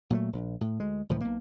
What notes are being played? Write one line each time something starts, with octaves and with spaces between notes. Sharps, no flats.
A#2 F#3 G#3 A3
A#1
A2
D2 G#3
C#2 A2 E3 F3
B1 A#3